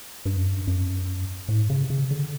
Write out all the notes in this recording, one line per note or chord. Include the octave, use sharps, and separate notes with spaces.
G2
F#2
G2
F#2
A2
C#3
C#3
D3